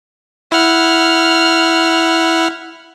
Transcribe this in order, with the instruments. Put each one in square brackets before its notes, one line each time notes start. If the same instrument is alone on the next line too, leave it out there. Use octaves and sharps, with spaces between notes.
[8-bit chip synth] E4 F#5 [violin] F6